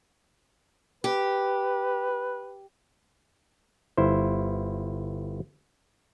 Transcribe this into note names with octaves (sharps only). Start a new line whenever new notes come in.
G4 B4
G1 E4 C5